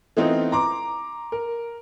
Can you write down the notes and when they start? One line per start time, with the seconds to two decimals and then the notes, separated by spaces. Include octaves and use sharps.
0.17 E3 A3 B3 C4 D#4 F4
0.52 A#5 C6 D6
1.32 A#4